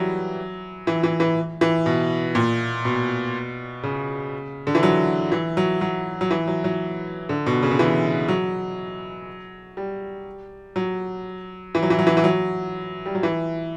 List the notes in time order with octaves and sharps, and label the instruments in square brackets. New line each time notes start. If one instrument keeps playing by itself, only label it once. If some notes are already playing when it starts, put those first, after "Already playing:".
Already playing: [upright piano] E3 F#3 G3
E3
E3
E3
E3
B2
A#2
B2
C#3
D3
E3
F#3
E3
F#3
F#3
F#3
E3
F#3
F#3
D3
B2
C#3
D3
E3
F#3
G3
F#3
E3
F#3
E3
F#3
E3
E3
F#3
G3
F#3
E3